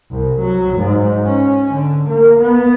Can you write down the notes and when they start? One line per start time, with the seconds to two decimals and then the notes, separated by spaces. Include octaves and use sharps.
0.11 C2
0.41 F#3
0.78 G#2
1.26 C#4
1.74 D3
2.09 A#3
2.40 B3